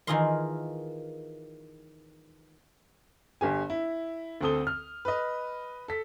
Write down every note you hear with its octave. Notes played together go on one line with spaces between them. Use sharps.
D#3 E3 F4 G#4 A#4 C6
G1 G4 G#5
E4
D2 D3 C4 A4 D#6 G7
F6
B4 D#5
A4 B6